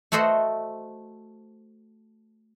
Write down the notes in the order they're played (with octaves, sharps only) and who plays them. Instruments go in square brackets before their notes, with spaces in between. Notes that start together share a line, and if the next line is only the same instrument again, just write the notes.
[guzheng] A3 F#4 A4 C5 D#5 F#5